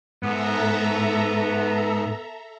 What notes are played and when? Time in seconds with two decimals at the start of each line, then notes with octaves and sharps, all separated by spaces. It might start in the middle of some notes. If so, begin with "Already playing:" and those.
0.23 G#2 B3 A4 E5 A#5